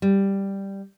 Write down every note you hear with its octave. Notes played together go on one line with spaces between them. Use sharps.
G3